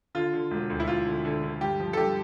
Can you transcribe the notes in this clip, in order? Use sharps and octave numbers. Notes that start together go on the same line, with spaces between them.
D3 F4
D3
E1
D2
E4
D2 F4
D3
D3
D3
G2 G4
F3
A4
G2 G4